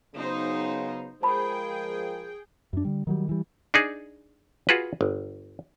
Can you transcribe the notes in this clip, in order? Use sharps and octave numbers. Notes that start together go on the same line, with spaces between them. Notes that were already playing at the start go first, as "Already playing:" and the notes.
C#3 F#3 B3 D#4 C5
F3 G#3 G#4 A#4 C5 G5 A5 B5
F#2 D4
D3 G3
D#3 F#3 G3
E3 G3
D4 D#4 G#4
F4 F#4 G#4 B4
G1